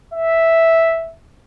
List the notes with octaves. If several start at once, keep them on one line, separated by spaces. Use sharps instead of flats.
E5